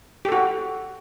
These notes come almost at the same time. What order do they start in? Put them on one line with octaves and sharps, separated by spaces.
G4 A4 F#4